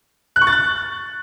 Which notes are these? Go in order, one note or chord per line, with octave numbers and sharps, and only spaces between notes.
F#6
C#6
A6
F#6